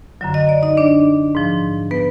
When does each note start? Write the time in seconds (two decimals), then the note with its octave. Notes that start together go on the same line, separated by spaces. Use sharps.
0.21 F#2 D3 F#3
0.34 D#5
0.49 D5
0.63 D#4 D#5
0.77 D4 D5
1.35 G#2 F3
1.91 B3 B4